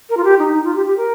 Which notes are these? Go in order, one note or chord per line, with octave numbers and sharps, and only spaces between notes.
A#4
F4
G4
D#4
D#4
F4
G4
G4
A#4